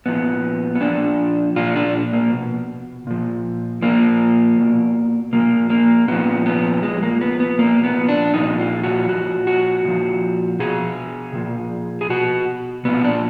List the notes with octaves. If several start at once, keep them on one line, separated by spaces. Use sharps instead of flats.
A#2 F3 B3
B3
A#2 F3 D4
A#2 F3 F4
D4
A#3
B2
A#2 F3
A#2 F3 A#3
B2
A#2 F3 A#3
A#3
A#2 F3 B3
B3
A#2 F3 G#3
A#3
B3
B3
A#2 F3 A#3
B3
D4
A#2 F3 D#4
F4
F#4
A#2 F3 F#4
F#4
A#2 F3
B2 G#4
A#2 F3
G#4
B2 F#4
A#2 F3 B3
D4